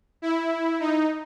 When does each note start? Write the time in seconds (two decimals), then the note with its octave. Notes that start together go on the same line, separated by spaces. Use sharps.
0.22 E4
0.80 D#4